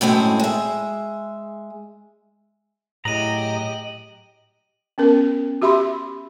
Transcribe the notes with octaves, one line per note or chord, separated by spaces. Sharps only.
F#2 A2 G#3 C4
G#3 E5
A2 F#3 G4 G#4 D#5 A#5 D#7 F#7
B3 C#4 A#4
F#4 G4 E5 B5 C6